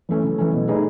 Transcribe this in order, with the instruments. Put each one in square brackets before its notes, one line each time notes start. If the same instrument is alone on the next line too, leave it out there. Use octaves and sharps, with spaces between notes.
[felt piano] E3 A3 C#4
C#3
E3 A3 C#4
B2
A3 D#4 G#4 B4